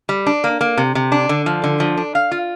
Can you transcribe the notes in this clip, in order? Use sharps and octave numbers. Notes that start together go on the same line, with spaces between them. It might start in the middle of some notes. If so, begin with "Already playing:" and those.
G3
D4
A#3
A#3
C3
C3
D4
D3
F3
D3
F3
D4
F5
F4